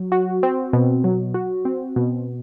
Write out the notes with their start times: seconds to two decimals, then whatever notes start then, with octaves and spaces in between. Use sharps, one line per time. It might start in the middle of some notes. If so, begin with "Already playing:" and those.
Already playing: F#3
0.12 F#4
0.43 C4
0.73 B2
1.04 F#3
1.34 F#4
1.65 C4
1.96 B2